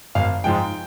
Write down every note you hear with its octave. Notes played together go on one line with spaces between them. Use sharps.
G#1 F5
G#2 F3 G#3 G5